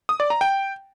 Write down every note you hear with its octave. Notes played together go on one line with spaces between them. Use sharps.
D#6
D5
A#5
G5